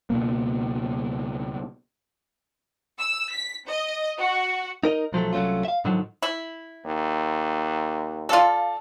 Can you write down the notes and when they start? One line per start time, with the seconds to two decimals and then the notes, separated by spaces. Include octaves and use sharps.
0.10 C#2 B2 A#3
2.99 E6
3.33 B6
3.67 D#5
4.19 F#4
4.83 D#4 A#4 D#5
5.13 B1 F3 F#3 A3
5.33 C2 F#3 A3 C#4 F4
5.65 E5 F5
5.85 G#2 D3 D#3 F3 F#3
6.22 E4
6.85 D#2
8.29 F4 A4 D5 F5